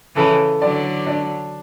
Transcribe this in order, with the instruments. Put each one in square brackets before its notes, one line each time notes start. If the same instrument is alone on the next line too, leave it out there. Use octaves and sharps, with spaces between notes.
[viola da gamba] C#3 E3 [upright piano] A4
[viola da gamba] D3 F#3 [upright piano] D5
[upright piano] D4